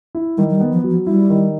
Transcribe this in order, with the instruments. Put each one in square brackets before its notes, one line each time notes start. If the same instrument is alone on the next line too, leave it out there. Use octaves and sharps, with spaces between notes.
[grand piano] E4
[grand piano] D#3 [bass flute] G3
[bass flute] F#3
G3
[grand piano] B3
[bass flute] F3
[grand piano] F#3
[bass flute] F3
[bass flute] G3 [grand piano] E4
[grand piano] D#3